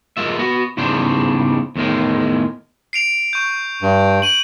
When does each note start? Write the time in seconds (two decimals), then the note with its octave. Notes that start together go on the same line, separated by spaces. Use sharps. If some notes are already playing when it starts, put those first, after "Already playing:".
0.17 G#3 A#3 F4 E5
0.36 B3 F#4
0.77 E2 G#2 C#3 G3 D4 C5
1.76 E2 A2 D#3 G#3
2.93 C7 D7 F7
3.33 C#6 G6
3.82 G2
4.22 D#7 F#7